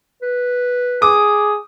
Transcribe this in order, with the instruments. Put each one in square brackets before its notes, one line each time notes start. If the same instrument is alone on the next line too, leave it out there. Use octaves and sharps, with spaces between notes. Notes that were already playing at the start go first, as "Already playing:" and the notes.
[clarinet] B4
[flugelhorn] G#4 [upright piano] D6 [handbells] D#6